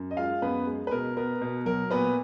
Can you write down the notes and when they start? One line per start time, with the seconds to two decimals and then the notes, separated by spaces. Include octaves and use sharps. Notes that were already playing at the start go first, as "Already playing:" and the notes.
Already playing: F#2
0.11 D#5
0.17 G#3 F4 F5
0.42 F#2 B3 B4
0.67 G#3
0.87 B4
0.91 B2 A#4
1.17 B3 A#4
1.41 B2
1.65 F#3 A#4
1.91 A#2 B3 B4